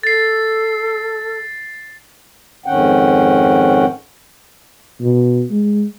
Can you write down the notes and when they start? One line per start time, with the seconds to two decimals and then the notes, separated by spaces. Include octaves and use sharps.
0.03 A4 A6 C7
2.66 F2 G#2 D#3 C#4 F#5 G5
5.01 B2
5.51 G#3